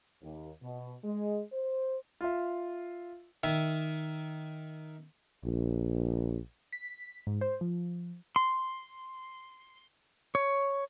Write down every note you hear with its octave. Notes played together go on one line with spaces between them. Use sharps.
D#2
B2
G#3
C5
F4 E5
D#3 E5
A#1
B6
G#2
C5
F3
C6
C#5